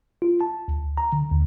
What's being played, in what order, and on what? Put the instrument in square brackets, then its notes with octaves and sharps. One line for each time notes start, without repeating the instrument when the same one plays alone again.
[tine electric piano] F4
A5
D2
A#5
D3
D#2